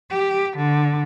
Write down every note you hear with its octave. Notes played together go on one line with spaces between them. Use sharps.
G4
D3